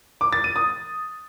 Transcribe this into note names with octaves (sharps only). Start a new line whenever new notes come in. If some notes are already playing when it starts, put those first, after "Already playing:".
D6
A6
D#7
D#6